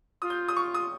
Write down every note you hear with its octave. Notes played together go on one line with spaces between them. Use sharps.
F4 D#6
G6
D#6
C#6
D#6